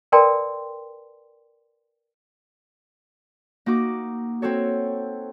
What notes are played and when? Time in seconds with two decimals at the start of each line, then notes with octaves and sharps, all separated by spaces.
0.12 A#4 B4 D5 G5 A5 C6
3.66 A#3 D#4 F#4 D6
4.42 C4 F#4 A4 C#5